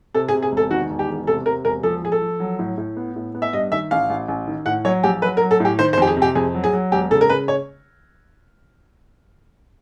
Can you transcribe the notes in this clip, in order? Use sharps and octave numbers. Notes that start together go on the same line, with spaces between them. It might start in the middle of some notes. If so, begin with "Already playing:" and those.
C3 A4
G#4
C3
G#4
E1
A4
D#3 F#4
E1
G4
E2
C3 A4
C3 A#4
E1 A#4
F3 A4
F3 G#4
A4
F3
F#3
A2
A2
B3
A2
B3
E5
G2 D#5
D#3 E5
A1 F5
A1
A1
D#3
A2 F#5
F#3 C#5
A#1 G4
F#3 B4
A#4
F#3
A4
A2 G4
D#3 C5
C5
F2 G4
G#4
C3
G4
F2 G#4
F#3
G#4
F#3
E1 G4
C#3 A4
A#4
C#3 B4
C#5